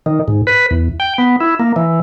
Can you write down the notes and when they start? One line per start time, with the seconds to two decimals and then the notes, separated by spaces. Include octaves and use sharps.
0.06 D#3
0.28 G#2
0.47 B4
0.71 E2
1.00 G5
1.18 B3
1.40 E4
1.60 A#3
1.76 E3